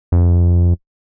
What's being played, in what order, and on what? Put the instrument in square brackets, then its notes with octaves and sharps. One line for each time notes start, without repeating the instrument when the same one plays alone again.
[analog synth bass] F2